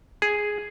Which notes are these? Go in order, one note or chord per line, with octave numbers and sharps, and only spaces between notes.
G#4